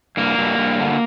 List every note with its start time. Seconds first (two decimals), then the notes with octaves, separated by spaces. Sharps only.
0.17 G2 A#3
0.38 G2
0.59 G2
0.80 D3